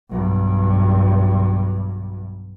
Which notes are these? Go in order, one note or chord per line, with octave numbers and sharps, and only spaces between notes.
B1 G2